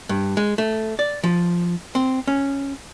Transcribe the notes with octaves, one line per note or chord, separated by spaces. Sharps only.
G2
G#3
A3
D5
F3
C4
C#4